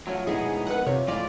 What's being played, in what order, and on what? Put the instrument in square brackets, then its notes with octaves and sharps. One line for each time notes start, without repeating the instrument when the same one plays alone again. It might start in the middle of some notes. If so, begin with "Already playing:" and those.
[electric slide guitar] F3 F#3 [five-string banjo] A3 C#5
[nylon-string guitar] B2 F3 E4 [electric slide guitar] G#3 B3 D#4 [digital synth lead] G#4
[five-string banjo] A#4 B4 [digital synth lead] F#5
[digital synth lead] C3 [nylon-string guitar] F4 [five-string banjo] C#5
[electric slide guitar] A2 G#3 F4 [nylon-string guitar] F3 [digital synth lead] D5